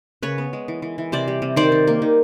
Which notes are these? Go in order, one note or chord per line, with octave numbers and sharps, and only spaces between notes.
C#3 B4 C#5
B3
G#3
E3
E3
E3
C3 C5 D5
G3
C3
D#3 C5 D5
D#3
A#3
D#3